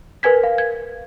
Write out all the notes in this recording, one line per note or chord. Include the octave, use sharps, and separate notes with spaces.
A#4 B4 G#5 G#6 B6
F5
G#6